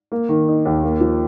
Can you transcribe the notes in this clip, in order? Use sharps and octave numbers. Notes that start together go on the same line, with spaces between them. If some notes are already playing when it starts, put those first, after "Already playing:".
A#3
D#3
D#4
D#2
A#3
F3